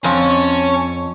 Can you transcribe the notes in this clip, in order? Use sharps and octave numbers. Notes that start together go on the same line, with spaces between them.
F2 C#4 C#5 A5 C#6